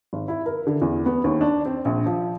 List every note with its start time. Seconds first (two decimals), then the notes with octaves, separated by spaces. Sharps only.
0.13 G#1
0.28 E4
0.46 A#4
0.67 D3
0.82 E2
1.06 B3
1.24 D#2
1.41 D4
1.66 C4
1.85 A#1
2.06 F3